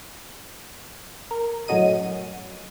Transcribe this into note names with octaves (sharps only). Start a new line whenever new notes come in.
A#4
F#2 A2 C#4 F#4 D#5 D#7